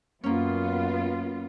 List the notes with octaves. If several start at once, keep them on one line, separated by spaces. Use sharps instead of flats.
F#2 A#3 B3 C#4 F4